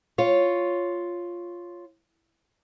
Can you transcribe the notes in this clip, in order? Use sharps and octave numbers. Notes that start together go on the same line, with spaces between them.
F4 C#5